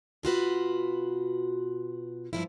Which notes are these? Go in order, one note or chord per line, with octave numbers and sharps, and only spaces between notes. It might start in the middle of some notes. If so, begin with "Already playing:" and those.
B2 F4 F#4 B4
G2 F3 E4